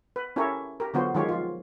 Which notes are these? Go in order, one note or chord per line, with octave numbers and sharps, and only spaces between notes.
B4
C#4 E4 G4 A4 A#4 C#5
G4 A#4
D3 F#3 B3 F4 F#4 C5
D#3 F#3 G#3 F4 G4 C#5
F3 F4